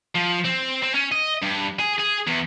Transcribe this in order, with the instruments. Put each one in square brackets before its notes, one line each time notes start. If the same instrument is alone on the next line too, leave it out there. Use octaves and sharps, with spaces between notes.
[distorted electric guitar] F3
C4
C4
C#4
D#5
G2
G#4
G#4
E2